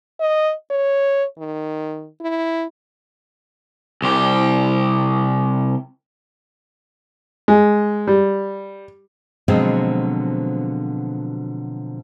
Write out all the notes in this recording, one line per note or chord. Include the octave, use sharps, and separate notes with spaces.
D#5
C#5
D#3
E4
C2 G4
G#3
G3
B2 D3 F3 F#3 G#3 C4